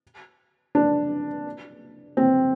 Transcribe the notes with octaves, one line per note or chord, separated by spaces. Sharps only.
D4
C4